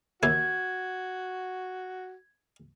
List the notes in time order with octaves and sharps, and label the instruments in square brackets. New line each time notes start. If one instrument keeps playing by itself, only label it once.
[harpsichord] D#2 E4 [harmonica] F#4 [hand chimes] G#6